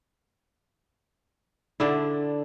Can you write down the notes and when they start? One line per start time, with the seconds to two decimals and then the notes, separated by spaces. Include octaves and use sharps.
1.80 D3 D4 E4